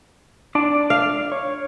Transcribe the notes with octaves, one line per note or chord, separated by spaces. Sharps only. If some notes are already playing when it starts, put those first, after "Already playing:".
D4 D5 A5
F5
C#5